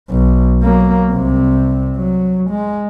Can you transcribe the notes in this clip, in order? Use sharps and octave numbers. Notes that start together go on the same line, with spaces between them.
B1
F#3 A#3
C2 C3
F#3
G#3